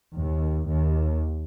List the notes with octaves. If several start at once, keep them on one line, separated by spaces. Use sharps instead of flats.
D#2
D#2